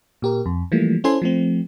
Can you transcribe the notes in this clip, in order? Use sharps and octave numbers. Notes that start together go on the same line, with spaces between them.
A#2 G4 A#4
F2
E3 F3 G3 A3 A#3
C#4 E4 A4 C5 G#5 C6
F3 A3 C4